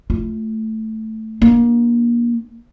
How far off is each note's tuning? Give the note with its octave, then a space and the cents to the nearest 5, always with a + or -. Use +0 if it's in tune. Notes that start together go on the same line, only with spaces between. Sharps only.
A3 +0 F4 -5
A#3 +25 D4 +25